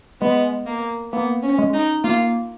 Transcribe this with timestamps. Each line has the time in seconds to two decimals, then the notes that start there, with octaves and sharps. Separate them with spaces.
0.21 G#3 B3
0.67 A#3
1.13 A#3 B3
1.43 C#4
1.58 G#3
1.74 D#4
2.04 A#3 F4